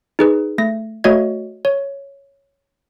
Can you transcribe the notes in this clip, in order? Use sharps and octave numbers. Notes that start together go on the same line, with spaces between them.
D#4 G#4 B4
A3 A#6
A3 F#4 C#5 D#5 G#6
C#5